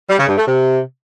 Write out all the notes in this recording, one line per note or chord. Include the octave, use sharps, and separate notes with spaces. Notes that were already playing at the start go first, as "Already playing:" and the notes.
G3
C#3
G2
A3
C3